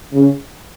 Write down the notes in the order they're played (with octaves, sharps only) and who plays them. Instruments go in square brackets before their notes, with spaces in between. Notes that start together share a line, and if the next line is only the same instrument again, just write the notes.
[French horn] C#3